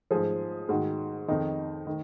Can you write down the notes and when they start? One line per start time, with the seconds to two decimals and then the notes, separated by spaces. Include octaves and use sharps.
0.11 G#2 F3 G#4
0.69 G#2 D#3 F#4
1.28 F2 D#3 D#4
1.87 D#3